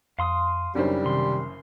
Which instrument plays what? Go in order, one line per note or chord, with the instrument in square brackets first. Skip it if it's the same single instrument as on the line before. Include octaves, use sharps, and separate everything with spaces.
[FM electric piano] F2 [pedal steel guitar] F5 C6 D#6
[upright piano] F#1 F#2 C5 [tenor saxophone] G3 [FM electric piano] D4 D#4 C#5
[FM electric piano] C3 D#3 [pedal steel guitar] C6